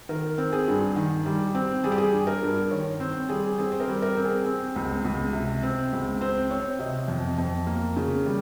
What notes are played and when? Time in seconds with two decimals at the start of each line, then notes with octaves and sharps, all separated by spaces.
0.09 D#3 A#4
0.38 C4
0.52 G#4
0.68 G2
0.96 D#3
1.26 G3
1.55 C4
1.84 G3 G#4
1.92 G4
1.98 G#4
2.12 G2
2.27 A#4
2.43 G2
2.71 D#3 C#5
3.00 C4 C5
3.29 G3 G#4
3.58 C4 G#4
3.72 C5
3.80 A#4
3.88 G3
4.02 A#4
4.17 C4
4.25 G#4
4.46 C4
4.76 C#2
5.05 C#2
5.33 C3
5.63 C4
5.92 C#2
6.21 C4 C5
6.50 C4 C#5
6.79 C3 D#5
7.08 F2
7.38 F2
7.67 A#3
7.97 C#3
8.26 G3